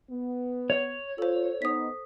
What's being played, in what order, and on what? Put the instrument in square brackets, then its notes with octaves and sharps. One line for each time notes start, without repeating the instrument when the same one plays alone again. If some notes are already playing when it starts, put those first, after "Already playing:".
[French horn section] B3
[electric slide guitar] C#5
[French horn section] F4 [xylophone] A4 C5
[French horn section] B3 D#4 [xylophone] D#6 B6